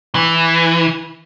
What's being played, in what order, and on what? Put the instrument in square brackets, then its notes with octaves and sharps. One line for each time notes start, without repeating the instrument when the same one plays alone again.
[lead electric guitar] E3